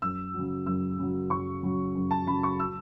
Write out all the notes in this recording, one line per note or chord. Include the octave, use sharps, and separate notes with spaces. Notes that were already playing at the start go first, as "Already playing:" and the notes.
F#2 E6
C#3 F#3
F#2 E6
C#3 F#3
F#2 C#6
C#3 F#3
F#2
A5
C#3 F#3 B5
C#6
E6